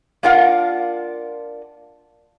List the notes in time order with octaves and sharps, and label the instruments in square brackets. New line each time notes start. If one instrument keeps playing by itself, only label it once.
[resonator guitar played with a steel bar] A#3 D4 F4 A#4 F5 F#5